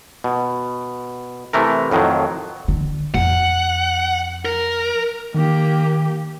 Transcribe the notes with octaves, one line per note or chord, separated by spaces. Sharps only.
B2
C3 E3 A3 A#4
F2 A2 D#3 F#3
D3
F2 F#5
A#4
D#3 A#3 G4